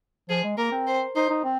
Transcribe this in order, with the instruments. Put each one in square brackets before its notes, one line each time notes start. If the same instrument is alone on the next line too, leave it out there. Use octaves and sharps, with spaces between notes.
[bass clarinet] F3 [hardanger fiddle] G#4
[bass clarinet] G#3
[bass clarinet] A#3 [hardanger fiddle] A#4
[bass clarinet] C4
[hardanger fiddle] C5
[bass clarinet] D#4 [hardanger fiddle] C5
[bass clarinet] D#4
C4